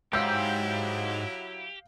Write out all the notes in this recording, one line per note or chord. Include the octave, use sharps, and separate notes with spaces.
G#2 F#3 E4 G4 F5 E6 G6